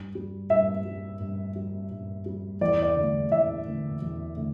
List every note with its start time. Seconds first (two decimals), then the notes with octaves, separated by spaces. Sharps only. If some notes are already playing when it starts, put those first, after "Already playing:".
Already playing: G2
0.15 G3
0.50 G2 E5
0.85 G3
1.20 G2
1.56 G3
1.91 G2
2.26 G3
2.61 E2 D5
2.83 D5
2.96 D3 A3
3.32 E2 E5
3.67 D3 A3
4.02 E2
4.37 D3 A3